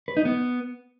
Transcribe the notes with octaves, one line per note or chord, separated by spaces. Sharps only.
B4
D#4
B3